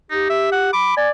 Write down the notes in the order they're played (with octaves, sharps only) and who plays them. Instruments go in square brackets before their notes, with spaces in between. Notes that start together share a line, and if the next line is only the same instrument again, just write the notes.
[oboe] D#4 [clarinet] G4
[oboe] E5
F#5
[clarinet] B5 [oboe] D6
[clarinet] D5 [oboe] G#5